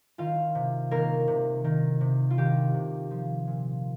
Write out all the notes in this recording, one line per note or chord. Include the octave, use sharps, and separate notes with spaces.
D#3 F4 F5
C3
D#3 A#3 A#4
C3
D#3
C3
F4
D#3 G4
C3
F3
A#2